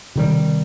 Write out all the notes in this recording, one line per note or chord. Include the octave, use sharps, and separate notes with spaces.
C3 D#3 G3